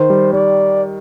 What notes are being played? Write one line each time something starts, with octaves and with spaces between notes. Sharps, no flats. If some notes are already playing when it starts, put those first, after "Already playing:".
Already playing: D#3 C5
G3
G3 D5